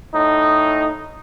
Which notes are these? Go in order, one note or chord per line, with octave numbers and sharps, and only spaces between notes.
A2 D#4